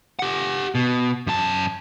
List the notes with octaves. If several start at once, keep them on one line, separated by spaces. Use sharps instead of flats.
G4 F#5
B2
F#2 A5